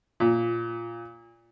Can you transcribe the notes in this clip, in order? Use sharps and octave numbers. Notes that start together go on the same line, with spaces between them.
A#2